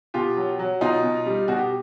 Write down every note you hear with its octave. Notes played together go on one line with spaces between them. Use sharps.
B2 F4 G4
F#3
F#3
B2 D#4 F4
B2
G3
B2 F#4
G4